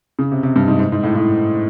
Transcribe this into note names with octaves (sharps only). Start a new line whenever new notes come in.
C#3
C3
C3
G2
G#2
G#2
G#2
A2
A2